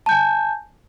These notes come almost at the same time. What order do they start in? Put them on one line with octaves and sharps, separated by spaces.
A5 G6 G#5